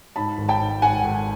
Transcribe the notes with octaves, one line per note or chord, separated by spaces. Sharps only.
G#2 A5 B5
G#1
G5 A5
G#2
G#1 F#5 G#5
G#1